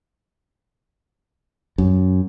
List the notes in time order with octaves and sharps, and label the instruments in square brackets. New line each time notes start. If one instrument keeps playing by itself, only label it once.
[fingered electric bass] F#2